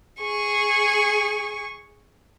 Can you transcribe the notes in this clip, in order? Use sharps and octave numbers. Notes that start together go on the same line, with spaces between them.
G#4 C#6